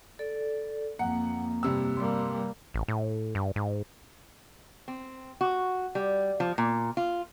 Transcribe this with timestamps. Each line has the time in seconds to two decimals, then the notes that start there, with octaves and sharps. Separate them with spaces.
0.19 A4 D5
0.99 F2 A#3 F#5
1.63 G2 C3 E6
1.97 G3 A#3 C6
2.74 A1
2.88 A2
3.35 G2
3.56 G#2
4.88 C4
5.41 F#4
5.95 G3
6.40 F3
6.58 A#2
6.97 F4